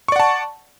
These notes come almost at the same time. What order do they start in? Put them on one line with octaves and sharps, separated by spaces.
C#6 D5 F#5 A5